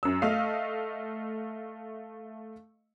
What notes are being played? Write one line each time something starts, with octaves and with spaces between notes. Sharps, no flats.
F#2 E6
A3 D#5 F5